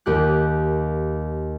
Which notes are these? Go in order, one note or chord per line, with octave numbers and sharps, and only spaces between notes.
D#2 G4 F#6